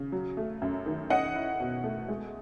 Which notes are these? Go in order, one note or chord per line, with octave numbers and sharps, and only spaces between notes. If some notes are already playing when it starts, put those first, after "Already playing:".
Already playing: C#3
F#3
A3
F#2
D#3
C#4 D#5 F#5
E4
B2
A3
G#3